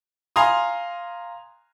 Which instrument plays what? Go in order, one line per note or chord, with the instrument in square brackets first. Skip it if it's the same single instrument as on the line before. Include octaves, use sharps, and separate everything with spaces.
[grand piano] F5 G#5 A#5 C6 D#6